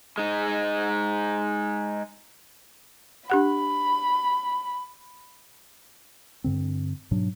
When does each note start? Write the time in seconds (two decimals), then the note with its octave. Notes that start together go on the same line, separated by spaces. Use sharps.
0.18 G#3 D#4
3.30 D4 G4 F#5 B5
6.44 G2 D3 C4
7.11 G#2 B2 F#3 D4